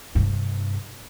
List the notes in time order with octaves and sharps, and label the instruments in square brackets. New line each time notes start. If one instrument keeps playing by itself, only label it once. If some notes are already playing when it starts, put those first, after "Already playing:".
[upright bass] G2 C3